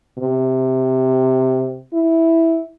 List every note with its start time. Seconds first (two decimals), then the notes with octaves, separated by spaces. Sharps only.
0.19 C3
1.94 E4